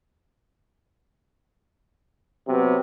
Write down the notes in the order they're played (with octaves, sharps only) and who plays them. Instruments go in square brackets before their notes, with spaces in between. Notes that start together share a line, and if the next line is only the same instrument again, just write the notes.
[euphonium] C3 [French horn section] F#3 B3